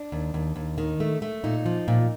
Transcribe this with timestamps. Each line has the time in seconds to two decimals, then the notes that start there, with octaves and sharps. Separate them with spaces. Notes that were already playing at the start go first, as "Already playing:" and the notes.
Already playing: D4
0.12 D#2
0.34 D#2
0.56 D#2
0.78 D#3
1.00 A3
1.22 A3
1.44 A#2 D#4
1.66 F3
1.88 A#2